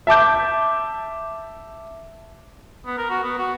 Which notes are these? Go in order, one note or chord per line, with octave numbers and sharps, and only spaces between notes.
E5 A5 D6 G6
B3
A#4
F#4
B3
F#4